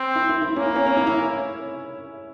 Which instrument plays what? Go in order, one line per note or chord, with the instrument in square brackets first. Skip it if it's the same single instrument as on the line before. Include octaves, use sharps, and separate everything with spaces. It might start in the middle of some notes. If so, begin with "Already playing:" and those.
Already playing: [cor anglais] C4
[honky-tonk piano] E4
E4
E4
[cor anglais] A#3 [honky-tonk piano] C#4
[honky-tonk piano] E4
C#4
C#4
E4
E4